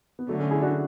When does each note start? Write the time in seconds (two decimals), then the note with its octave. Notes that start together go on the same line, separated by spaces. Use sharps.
0.19 B3
0.29 D3 F#3 A3
0.40 A3 C#4
0.51 E4 G#4
0.62 D4 F#4